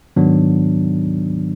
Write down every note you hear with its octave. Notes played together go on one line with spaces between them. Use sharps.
G#2 D#3 F#3 B3 D4